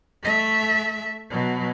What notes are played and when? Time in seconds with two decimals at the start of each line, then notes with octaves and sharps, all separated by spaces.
0.23 A3 E5
1.30 B2 F#3